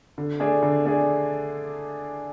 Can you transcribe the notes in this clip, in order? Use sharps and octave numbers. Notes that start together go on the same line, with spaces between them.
D3
A3 D4 G#4
D3
A3 D4 G#4